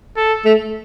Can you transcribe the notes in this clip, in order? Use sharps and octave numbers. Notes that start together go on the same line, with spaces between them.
A4
A3